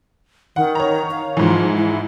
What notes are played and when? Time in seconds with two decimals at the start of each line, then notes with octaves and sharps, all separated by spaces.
0.56 D#3 F#5
0.75 C#5 A#5
1.11 F5
1.37 G#2 E3 F3
1.78 E4